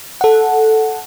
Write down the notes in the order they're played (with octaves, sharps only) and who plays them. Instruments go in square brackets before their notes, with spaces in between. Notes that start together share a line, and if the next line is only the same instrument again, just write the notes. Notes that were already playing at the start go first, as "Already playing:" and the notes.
[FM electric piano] A4 F#5